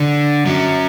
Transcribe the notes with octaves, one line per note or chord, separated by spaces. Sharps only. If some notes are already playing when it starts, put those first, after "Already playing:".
Already playing: D3
F#2 F#3